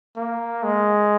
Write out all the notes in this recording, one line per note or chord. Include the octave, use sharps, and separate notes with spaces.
A#3
G#3